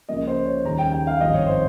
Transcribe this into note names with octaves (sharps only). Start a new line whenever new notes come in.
C#2 C#3 F3 A#3 D#5
C5
C#5
D#2 C#3 G3 A#5
G5
G5
F5
G#1 G2 F3 C4 D#5
C#5
C5